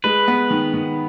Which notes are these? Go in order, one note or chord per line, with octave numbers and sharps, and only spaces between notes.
G#3 B4
B3
D#3
D#3